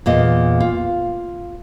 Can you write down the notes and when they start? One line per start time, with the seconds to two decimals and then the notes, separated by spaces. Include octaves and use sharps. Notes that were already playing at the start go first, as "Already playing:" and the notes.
0.06 E2 A#2 D#5
0.60 F4